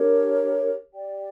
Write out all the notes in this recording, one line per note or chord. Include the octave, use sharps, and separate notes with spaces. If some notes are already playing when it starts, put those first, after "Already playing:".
Already playing: D4 G4 A#4 C#5
G4 D5 G5